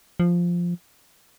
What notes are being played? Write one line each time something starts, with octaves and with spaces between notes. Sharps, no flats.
F3